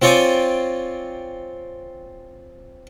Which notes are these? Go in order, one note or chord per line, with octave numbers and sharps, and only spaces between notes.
C4 F4 C#5 D5 G5 G#5